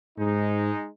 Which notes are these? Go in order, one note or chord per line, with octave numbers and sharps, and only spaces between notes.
G#2 G#3 D#4